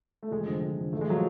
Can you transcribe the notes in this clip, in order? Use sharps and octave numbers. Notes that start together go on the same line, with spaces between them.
A3
F1 G#3
F2 D3
F1
F2 D3
A1 A3
G#3
F3 F#3